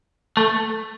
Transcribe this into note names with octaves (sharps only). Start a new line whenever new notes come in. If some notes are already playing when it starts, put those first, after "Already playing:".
A3